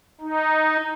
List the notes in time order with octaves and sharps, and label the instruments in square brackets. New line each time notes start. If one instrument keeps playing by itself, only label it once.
[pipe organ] D#4